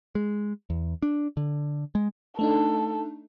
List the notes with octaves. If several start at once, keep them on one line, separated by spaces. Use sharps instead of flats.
G#3
E2
D4
D3
G#3
A3 D4 D#4 A4